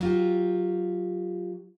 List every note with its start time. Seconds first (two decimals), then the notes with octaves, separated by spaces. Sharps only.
0.01 F#3 F4 G4